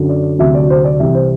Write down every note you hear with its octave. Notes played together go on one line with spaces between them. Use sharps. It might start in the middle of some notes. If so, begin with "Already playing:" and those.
Already playing: F#2 D3 F#3
D5
D2 C3 F#3 E5
D5
C5
D5
C2 C3 E3 G3 E5
C5